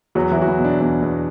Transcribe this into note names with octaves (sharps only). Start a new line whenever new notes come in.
E2 F#3 F#4
E3 E4
F#3 F#4
E3 E4
B2
D4
E2 D4
E2